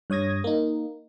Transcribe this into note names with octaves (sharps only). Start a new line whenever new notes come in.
G2 C#5 D#6 G#6 A#6
A#3 D#4